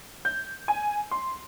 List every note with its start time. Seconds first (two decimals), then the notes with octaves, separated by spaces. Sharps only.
0.25 G6
0.68 G#5
1.11 C6